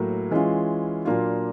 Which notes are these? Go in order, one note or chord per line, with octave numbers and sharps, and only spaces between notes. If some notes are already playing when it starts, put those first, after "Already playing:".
Already playing: A2 F#3 A#3
E3 G#3 C#4 F4
A#2 F#3 A#3 D4 F4